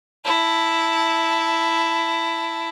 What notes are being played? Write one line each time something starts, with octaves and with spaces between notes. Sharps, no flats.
E4 A5